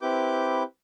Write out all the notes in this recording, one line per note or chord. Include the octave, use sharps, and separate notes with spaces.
C4 E4 G4 B4 D6 G6